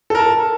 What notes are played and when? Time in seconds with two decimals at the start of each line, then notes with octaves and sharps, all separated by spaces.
0.10 A4
0.15 A#4
0.19 A5